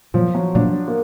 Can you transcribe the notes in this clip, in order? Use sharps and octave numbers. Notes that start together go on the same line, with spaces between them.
A#2 F3 F#3 A#3
F#3
A#2 F#3 A#3 D4
A#3